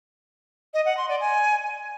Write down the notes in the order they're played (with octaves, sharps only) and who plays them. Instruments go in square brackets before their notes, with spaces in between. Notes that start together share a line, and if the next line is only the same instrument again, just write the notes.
[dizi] D#5
F#5
C6
D5
G#5